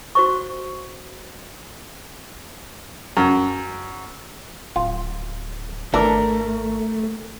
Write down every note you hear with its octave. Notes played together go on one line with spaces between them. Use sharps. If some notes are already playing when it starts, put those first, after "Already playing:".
F#4 C5 C#6
F#2
D1 F4
G#1 E3 A3 D4 A#4